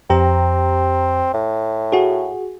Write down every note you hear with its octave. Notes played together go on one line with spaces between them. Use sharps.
F2 C4 G4 A#5
A2
F#4 G#4